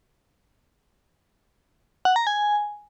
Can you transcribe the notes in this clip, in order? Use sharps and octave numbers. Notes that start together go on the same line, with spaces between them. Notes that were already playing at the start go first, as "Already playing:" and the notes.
F#5
A#5
G#5